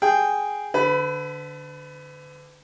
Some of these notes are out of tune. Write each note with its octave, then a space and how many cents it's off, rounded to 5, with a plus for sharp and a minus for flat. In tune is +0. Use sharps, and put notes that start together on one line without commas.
G#4 +0 G5 +0
D3 +0 B4 +40 B5 +0